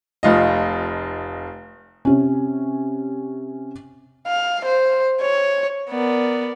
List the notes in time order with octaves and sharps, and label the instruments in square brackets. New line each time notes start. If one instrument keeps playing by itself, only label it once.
[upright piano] F1 F4 D#5
[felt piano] C3 C#4
[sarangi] F5
C5
C#5
[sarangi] B3 [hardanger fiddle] A#4 D5